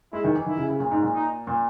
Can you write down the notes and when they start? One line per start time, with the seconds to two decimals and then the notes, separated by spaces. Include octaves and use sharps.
0.13 G#3 E4
0.24 D#3
0.35 E3
0.46 D#3 E4
0.57 C#3
0.69 C#3
0.80 A#2
0.91 G#2
1.02 A#2
1.14 D#4
1.47 A#2